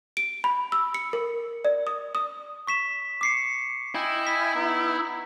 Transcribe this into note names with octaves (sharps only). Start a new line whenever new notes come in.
D7
B5
E6
C#7
A#4
D5
D#6
D#6
C#6 B6 E7
D6 C7 C#7
E4 D#5 G5 G#5
B6
B3 D#4